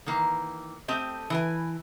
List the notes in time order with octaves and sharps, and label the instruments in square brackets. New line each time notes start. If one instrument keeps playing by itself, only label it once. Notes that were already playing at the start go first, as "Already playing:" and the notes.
[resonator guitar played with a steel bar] D#3 E3 A#3
A3 C4 G4 D#5
E3 B4 G#5